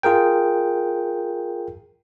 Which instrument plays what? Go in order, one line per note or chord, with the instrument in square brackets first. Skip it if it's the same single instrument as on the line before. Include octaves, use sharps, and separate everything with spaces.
[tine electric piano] F4 G#4 A#4 G5